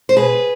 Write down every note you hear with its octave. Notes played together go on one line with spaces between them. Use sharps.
C5
B2 G#4 B4